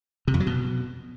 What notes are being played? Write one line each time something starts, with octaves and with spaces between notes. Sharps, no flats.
C3
F2
F#3
B2